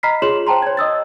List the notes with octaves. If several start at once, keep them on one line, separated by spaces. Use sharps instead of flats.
D#5 A#5 B5 F6 B6 C7
F4 G#4 C#5 C6 E7 F#7
C5 G5 A5 A#5 C6
C#5 G#6
D#5 D#6 E6 A6